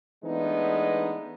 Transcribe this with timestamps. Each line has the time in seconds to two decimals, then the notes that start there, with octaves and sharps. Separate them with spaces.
0.24 E3 G#3 A3 B3 D4 D#4